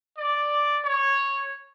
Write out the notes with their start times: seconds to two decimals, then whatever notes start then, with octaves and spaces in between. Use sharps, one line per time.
0.17 D5
0.84 C#5